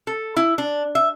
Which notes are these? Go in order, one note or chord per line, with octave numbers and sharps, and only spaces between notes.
A4
E4
D4
E5